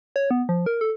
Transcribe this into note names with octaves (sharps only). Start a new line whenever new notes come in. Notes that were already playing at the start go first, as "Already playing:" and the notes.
C#5
B3
F3
A#4
A4